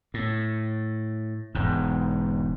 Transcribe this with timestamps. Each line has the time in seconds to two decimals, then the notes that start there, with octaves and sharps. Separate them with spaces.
0.14 A2
1.55 E1 G#2